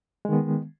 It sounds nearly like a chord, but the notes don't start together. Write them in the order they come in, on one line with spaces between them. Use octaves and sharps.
G#3 D#3 B3